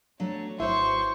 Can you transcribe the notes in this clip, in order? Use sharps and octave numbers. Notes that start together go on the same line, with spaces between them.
F#3 A3 D4 C#5
G#1 E4 F#4 C5 C#5 E5 C6 C#6